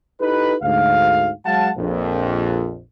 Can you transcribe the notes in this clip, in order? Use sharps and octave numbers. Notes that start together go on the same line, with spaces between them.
D#4 E4 G4 A4 B4
D2 G#2 F5
F#3 G#3 F5 F#5 A5
A#1 F2